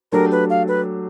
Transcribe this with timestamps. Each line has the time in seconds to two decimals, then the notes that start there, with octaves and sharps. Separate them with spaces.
0.12 F#3 A3 D4 G4 A#4
0.31 B4
0.50 F5
0.68 B4